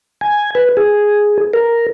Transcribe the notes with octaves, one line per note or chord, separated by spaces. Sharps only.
G#5
B4
G#4
A#4